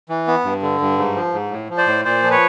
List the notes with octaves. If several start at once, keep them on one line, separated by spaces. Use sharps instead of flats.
E3
B3
G2
D3
G2
G#2
F3
G#2
A2
F3
C5 D5
A2
A#2 C5 D5
F3
B4 C#5